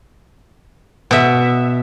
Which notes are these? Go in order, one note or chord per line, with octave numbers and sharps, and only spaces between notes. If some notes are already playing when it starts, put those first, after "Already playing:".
B2 E5